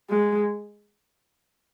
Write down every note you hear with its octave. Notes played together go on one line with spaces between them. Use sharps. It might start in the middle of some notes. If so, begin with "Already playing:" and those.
G#3